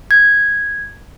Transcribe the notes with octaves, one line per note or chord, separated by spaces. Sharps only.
G#6